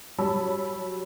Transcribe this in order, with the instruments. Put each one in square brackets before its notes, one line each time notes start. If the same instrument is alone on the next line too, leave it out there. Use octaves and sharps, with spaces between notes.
[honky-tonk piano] F#3 G3 C#5 A5 B5 E6